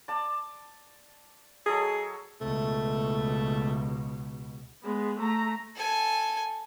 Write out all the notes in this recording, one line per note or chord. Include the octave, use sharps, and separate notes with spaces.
D5 A5
F#3 G#4 A4 D#5
C#2 B2 A3
G#3 B3
A3 A#5
A4 G#5